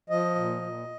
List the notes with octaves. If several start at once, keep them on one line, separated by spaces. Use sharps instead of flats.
F3 D#5
A#2
A#2